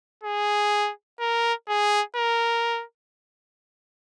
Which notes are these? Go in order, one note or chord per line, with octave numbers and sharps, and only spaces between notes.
G#4
A#4
G#4
A#4